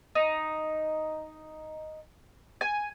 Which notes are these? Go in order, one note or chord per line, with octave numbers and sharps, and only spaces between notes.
D#4
G#5